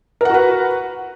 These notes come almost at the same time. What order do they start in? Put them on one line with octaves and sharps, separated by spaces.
A#4 F#5 F#4 B4